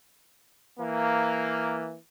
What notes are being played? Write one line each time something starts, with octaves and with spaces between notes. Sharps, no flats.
E3 A#3